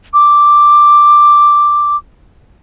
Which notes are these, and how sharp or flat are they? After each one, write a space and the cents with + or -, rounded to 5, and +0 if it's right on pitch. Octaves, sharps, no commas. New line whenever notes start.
D6 +5